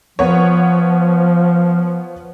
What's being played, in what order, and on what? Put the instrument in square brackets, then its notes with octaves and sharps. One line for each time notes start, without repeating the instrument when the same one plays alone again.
[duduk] F3 [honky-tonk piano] B3 C#5